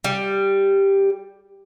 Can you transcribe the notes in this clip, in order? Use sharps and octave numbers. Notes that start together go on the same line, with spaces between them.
G3